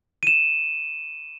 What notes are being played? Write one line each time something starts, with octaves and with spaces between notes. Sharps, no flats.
D#7 E7